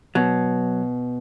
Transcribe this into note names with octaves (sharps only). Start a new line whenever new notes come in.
B2 F#3